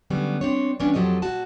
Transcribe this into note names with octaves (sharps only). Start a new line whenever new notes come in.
D3 F#3 G3 B3 C#4
C4 D4 C#5
E3 G3 A#3 B3 C#4 D4
F2 F3 F#3 G4 A4 D#5
A#2 F#4 A5